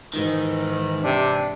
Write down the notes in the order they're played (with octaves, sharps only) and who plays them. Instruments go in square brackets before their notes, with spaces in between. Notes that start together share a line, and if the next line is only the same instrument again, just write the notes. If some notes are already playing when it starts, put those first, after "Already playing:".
[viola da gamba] G#2 E3 [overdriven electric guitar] D#3
[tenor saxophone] C3 [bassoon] D4